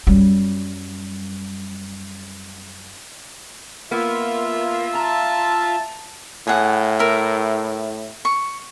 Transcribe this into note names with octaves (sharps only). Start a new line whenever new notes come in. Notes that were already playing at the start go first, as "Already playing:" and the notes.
F#2 G3
A#3 B3 F4 E5
A5 A#5
A2 G#4 F#5
A#4 E5
C#6